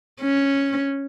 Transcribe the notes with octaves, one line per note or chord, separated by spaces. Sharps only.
C#4